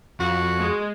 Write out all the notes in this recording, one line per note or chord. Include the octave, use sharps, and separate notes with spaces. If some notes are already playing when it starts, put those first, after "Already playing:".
F2 F#4
G#3